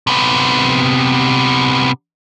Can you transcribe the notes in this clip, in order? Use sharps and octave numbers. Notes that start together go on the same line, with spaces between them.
C3 B3